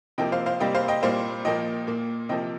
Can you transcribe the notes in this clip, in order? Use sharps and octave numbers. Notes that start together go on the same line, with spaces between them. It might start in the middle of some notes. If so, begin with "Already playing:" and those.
C3 F3 A#3 D#5 G5
C5 F5
C5 F5
C3 G3 A#3 D#5 G5
C5 F5
D#5 G5
A#2 G3 A#3 C5 F5
A#2 F3 A#3 D#5 G5
A#2 A#3
C3 F3 A#3 D#5 G5